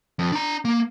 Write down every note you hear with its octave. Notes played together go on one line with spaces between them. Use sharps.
F2
D4 A#5
A#3